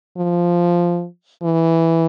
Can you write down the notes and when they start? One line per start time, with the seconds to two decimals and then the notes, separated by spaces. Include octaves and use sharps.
0.17 F3
1.43 E3